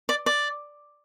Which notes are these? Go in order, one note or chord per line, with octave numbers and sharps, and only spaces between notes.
D5
D5